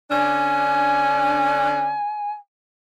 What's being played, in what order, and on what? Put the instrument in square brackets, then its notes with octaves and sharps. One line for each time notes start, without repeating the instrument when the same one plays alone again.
[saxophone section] D3 C#4 D4 [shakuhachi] G#5